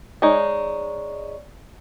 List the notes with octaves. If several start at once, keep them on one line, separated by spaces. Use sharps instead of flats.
G#3 D#4 C#5 D5 C#6